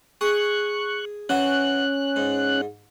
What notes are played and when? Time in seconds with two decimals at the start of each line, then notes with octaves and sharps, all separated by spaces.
0.21 G#4 C#6 F#6
1.29 E3 C#4 F#4 F#6
2.16 G#2